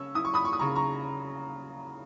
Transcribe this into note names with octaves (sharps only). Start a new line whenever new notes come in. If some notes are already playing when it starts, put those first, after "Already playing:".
Already playing: C#3 C#4 C#6 E6
E4 D#6
C#6
B5 D#6
C#6
D#6
C#3 A#5 C#6
A#5 C#6